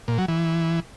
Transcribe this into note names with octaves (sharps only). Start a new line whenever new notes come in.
A#2
F#3
E3